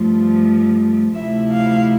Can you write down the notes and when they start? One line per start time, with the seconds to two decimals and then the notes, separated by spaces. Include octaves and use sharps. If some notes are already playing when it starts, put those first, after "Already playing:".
Already playing: G2 F3 A3
1.16 D2 C3 F3 A3 E4 E5
1.51 F5